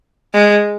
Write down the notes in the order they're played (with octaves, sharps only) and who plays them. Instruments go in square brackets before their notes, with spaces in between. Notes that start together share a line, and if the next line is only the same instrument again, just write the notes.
[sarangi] G#3